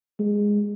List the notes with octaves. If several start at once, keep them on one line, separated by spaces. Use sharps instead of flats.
G#3